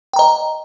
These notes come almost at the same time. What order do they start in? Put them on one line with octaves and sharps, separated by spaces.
G5 A#5 D#5